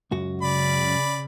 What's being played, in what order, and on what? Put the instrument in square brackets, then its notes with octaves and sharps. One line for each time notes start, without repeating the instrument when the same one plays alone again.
[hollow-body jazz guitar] C#2 F#2 F#4
[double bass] C#3 [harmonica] D5 B5